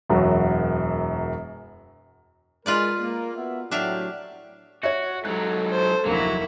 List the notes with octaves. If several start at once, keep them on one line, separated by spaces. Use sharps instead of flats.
E1 F#2 F#3
G#3 F4 A#4 B4 D5
A#3
B3 F#4 E5
A2 F#3 D4 G4 E5 F5
F#4 C#5 E5
G#2 F#3 A4 F#6
C5
F1 D2 F#3 A#3 E4